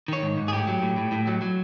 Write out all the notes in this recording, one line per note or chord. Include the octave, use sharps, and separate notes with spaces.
D#3 C#5
G#2
G#2
G#4
A2 G4
F#3
A2
A2
A2
F#3
F#3